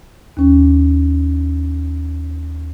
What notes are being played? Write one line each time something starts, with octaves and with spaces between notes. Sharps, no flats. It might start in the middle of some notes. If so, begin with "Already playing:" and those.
D#2 C#4